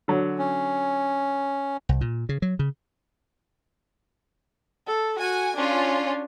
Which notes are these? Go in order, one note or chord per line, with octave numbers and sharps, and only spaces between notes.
D3 F#3
C#4
C2
A#2
C#3
F#3
C#3
A4
F#4 G#5
C#4 D4 F4